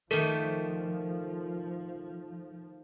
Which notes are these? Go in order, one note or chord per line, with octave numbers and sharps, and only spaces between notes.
D#3 F3 A3 A4 A#4